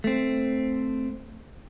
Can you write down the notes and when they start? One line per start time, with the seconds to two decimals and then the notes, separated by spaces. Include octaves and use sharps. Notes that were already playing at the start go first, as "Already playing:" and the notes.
0.04 A3 C4